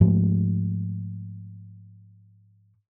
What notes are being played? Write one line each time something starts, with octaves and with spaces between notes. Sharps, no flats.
G#2 F3 A3